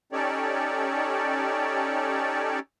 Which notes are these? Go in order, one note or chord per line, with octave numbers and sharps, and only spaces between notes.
C#4 D#4 G4 A4 C#5 D5